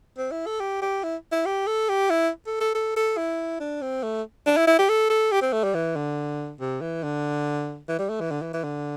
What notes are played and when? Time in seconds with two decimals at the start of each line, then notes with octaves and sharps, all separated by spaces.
0.18 C4
0.31 E4
0.46 A4
0.60 G4
0.81 G4
1.03 E4
1.31 E4
1.45 G4
1.67 A4
1.89 G4
2.10 E4
2.46 A4
2.61 A4
2.75 A4
2.96 A4
3.17 E4
3.60 D4
3.82 C4
4.03 A3
4.46 D4
4.57 E4
4.67 E4
4.79 G4
4.89 A4
5.10 A4
5.32 G4
5.42 C4
5.52 A3
5.64 G3
5.74 E3
5.96 D3
6.60 C3
6.81 E3
7.03 D3
7.88 E3
7.99 G3
8.09 A3
8.20 E3
8.31 D3
8.42 E3
8.53 E3
8.64 D3